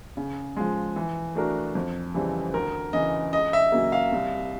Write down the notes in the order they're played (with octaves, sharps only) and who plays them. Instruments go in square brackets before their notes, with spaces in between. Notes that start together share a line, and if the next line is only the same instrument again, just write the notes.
[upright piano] C#3
F3 G#3
E3
A3 D4 F#4 A#4
F2
C#3 E3 G3 C4
[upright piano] D2 [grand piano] A#4
[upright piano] C#3 E3 [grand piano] D#5
[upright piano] C#2 [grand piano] D#5
[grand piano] E5
[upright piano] C#3 F#3 A#3
[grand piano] F5
[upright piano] C2